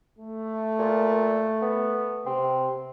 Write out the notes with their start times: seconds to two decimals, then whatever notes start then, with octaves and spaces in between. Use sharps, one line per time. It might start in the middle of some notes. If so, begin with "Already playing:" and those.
0.18 A3
0.79 A#2
1.62 B3
2.26 C3 C4